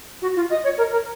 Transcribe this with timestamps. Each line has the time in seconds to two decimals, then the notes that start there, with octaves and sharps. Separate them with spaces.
0.22 F#4
0.36 F4
0.50 D#5
0.64 C#5
0.78 A#4
0.92 A#4